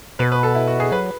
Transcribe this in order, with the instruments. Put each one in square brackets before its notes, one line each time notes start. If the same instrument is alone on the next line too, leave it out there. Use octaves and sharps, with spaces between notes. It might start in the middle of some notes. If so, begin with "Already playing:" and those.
[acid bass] B2 [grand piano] B4
[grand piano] B4
A4
E4
F#4
G#4
[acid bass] F#3 [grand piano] B4